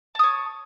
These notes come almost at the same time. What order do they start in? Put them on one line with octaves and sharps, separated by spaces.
A5 D#6 C#5